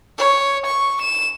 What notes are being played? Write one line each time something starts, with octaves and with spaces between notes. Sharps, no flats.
C#5
C#6
E7